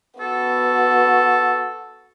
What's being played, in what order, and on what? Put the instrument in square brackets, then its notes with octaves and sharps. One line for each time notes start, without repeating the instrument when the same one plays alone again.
[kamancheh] B3 F#4 [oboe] A4